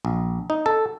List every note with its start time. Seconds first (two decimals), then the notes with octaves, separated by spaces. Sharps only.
0.05 A#1
0.50 D#4
0.66 A4